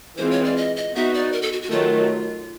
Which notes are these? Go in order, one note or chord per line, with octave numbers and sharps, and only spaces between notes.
E3 G#3 C4 F4 C5
C#5
D5
D#5
D#5
B3 D#4 F#4 E5
D5
A#4
A4
F#4
F#4
D#3 F#3 A3 F4